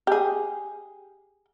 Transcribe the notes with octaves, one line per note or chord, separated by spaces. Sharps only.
G4 G#4